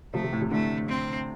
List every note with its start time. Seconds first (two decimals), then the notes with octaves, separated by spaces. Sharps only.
0.14 C3 F3 A3
0.24 C3
0.33 A2
0.42 C3
0.51 A2 D3 A3
0.89 C4